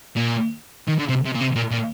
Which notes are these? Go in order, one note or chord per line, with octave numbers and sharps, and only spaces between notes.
A#2
D#3
D3
C3
C3
A#2
C3
A#2
A#2